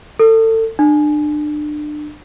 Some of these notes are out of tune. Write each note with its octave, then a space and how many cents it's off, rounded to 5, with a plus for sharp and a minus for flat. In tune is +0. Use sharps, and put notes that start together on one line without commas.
A4 +30
D4 +30